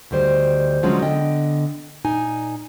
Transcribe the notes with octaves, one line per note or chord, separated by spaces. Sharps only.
D2 D#3 G3 C5
D3 F3 F#3 G#3 C#4
D3 B3 D#5 G5
A#2 D#4 G#5